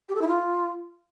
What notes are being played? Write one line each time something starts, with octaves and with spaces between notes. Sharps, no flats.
G4
A4
E4
F4